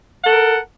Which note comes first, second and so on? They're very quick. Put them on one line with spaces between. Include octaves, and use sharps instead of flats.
F#5 A4 A#4